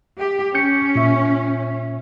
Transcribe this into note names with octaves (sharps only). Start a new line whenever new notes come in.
G4
C#4 G6 C#7
A#2 E5